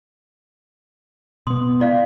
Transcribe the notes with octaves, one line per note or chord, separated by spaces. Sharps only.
B2 B3 C6 D#6
E4 D5 F5